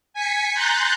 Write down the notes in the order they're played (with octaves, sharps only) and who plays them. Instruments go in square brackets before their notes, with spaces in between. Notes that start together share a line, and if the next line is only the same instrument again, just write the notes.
[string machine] G#5 B6 C#7
A#5 C6 F#6 G6 A6